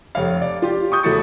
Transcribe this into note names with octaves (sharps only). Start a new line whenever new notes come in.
F1 C#5 F5
D5
F4 G4
C#6 D#6 G6
E1 A3 E4 F#4 A6 C#7